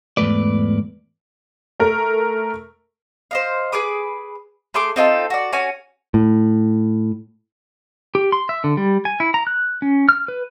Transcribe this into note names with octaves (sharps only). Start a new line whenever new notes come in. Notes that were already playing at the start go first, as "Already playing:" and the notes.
E2 G#2 B2 A3 B4 D5
A3 A#4
C5 D#5 F5
G#4 B4 D6 D#6
A3 G#4 C6 D6
C4 D#4 F4 A4
F#4 D5
C#4 F#4 G#5
A2
G4
C6
E5
D3
G3
G#5
E4
A#5
F#6
C#4
F6
B4